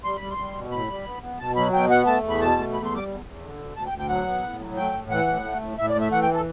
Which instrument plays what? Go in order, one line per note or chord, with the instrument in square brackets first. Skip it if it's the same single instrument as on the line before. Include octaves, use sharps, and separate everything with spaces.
[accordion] G3 C6
G3 B5
C6
G3
B2
A2 B5
G3
B3
B3
B2 A5
F#3 B5
B2 G5
B3 F#5
A3 A5
E2
B5
B2 A5
A3
E2 B5
C6
G3 D6
E2
E2
D3
D2
D2 A5
G5
D2
G5
F#3 F#5
B3
A2
F#3
A3 G5
A2
E3 F#5
A2
A3
A2
A2 E5
D5
A3 E5
E3 F#5
G5
A4